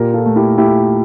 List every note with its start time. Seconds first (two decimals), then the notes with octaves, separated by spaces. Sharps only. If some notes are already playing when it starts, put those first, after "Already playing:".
Already playing: A#2 G4 A#4
0.14 F4 A4
0.26 A3
0.36 E4 G4
0.58 A3 E4 G4